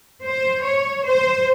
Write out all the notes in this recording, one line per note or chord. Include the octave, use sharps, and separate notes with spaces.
C5
C#5
C5